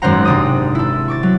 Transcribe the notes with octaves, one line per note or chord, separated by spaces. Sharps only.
G#1 F#2 C#4 C5 F#5 A#5
C3 D4 D#6
E4 A4
C#6 D6 A6
F#3